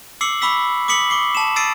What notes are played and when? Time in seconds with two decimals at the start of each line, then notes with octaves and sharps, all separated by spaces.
0.21 D6 E6 C7 C#7 F#7
0.42 B5 C#6 D6 E6 B6
0.88 D6 D#6 B6 C#7 F#7
1.10 C#6 D6 C7
1.35 A5 E7
1.56 D#6 E6 A6 C7 D7 D#7